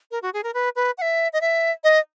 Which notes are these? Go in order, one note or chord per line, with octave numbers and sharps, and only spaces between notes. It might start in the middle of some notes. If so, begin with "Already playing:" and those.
A#4
F#4
G#4
A#4
B4
B4
F#5
E5
D#5
E5
D#5